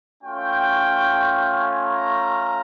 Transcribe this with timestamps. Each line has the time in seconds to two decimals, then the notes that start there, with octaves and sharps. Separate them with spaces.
0.23 A3 C#4 F4 G5
1.52 G#5
1.84 A#5